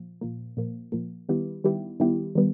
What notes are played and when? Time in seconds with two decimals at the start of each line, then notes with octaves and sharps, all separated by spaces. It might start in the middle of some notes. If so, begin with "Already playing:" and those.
Already playing: A#2 F3
0.21 A#2 F3 A#3
0.57 A#2 F3 A#3
0.92 A#2 F3 A#3
1.29 D#3 G3 B3 E4 G4
1.64 D#3 G3 B3 E4 G4
2.00 D#3 G3 B3 E4 G4
2.35 D#3 G3 B3